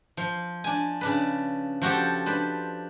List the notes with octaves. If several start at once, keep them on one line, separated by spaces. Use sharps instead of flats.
F3
D4 G#5
C#3 D4 B4
F3 F#4 G4 A4
D4 B4 C5